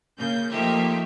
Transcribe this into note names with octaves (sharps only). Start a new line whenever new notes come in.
C#3 A#3 G6
F3 A3 A#3 D#4 G4 E5